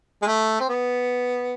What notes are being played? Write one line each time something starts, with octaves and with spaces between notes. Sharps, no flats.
G#3
A3
C4
B3